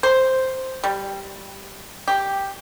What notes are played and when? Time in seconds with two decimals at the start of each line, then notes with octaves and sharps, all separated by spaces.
0.03 C5
0.84 G3
2.08 G4